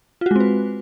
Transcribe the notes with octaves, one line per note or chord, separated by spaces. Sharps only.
G#3 C4 F4 F#4 B4